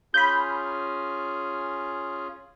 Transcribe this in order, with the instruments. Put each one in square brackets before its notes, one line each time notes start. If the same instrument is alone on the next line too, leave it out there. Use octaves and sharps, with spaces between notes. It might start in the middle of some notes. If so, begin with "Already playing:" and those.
[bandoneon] C#4 F4 G#4 [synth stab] B5 G6